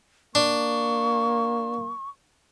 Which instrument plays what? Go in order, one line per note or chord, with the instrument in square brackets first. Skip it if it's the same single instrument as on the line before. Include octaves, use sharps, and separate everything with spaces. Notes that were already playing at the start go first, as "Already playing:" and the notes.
[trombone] A#3 [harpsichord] D4 [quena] C#6